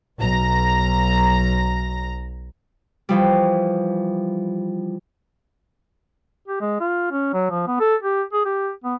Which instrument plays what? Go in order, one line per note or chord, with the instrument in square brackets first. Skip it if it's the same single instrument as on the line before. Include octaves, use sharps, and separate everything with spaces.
[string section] B1 A#5
[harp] E3 F3 G3
[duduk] G4
G#3
F4
C#4
F#3
F3
B3
A4
G4
G#4
G4
B3